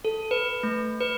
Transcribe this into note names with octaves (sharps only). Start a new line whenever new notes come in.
A4
B4
A3
B4